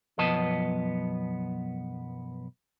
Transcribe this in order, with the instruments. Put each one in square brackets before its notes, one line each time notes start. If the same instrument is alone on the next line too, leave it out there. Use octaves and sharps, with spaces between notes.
[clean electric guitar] B1 F#2 F3 B3 D#5 A5